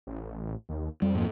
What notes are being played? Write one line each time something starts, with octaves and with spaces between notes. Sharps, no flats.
A1
D#2
F2 G3
G#2 A#3